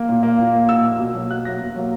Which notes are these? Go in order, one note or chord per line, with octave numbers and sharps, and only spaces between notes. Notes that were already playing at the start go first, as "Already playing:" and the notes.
Already playing: A#3
A#2
A#3
A#2
A#3
A#2 E6
A#3
B2
F#3 A#3
B2 F#6
F#3 A#3 A#6
B2
F#3 A#3